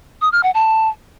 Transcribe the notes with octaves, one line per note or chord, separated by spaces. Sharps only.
D#6
F6
F#5
A5